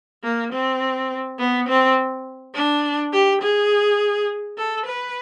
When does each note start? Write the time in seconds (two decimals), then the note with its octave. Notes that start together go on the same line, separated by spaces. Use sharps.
0.24 A#3
0.53 C4
1.39 B3
1.68 C4
2.55 D4
3.13 G4
3.42 G#4
4.58 A4
4.86 B4